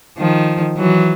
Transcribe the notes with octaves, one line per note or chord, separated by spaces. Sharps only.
D#3 F3
E3 F#3